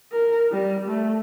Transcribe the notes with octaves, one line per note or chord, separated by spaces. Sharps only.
A#4
G3
A3